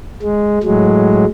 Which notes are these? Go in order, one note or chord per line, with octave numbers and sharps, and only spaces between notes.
G#3
A2 F#3 G#3